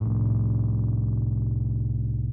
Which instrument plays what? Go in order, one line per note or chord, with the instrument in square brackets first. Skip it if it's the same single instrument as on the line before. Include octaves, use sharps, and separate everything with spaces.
[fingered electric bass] C2 A2